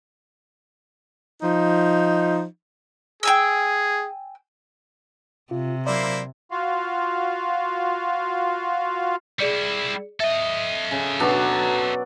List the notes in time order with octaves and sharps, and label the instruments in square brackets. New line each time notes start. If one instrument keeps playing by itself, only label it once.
[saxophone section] F3 D#4
[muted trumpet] G#4 [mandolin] G5 G#5 E6
[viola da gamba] C3 [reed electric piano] F4
[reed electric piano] F#3 D5 [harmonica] A#3 E4 C5
[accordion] F4 F#4 F5
[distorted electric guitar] G3 E4 [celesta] G#4 D5 C#7
[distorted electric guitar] A4 D#5 [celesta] E5
[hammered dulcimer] C#3
B2 F#3 D4